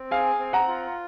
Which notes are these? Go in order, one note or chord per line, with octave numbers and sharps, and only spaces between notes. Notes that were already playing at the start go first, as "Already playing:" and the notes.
Already playing: C4
G#4 F5 G#5
C4
F#5 A#5
F4